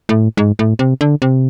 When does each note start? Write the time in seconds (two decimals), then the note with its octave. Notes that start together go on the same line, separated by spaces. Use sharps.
0.09 A2
0.37 G#2
0.59 A2
0.79 C3
1.01 D3
1.22 C3